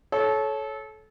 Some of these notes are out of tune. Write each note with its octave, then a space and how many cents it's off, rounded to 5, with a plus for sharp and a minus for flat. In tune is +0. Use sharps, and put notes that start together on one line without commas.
A4 -25 C#5 -5